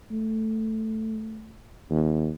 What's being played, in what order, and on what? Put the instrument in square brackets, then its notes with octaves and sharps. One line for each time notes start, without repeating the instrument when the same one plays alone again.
[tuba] A3
D#2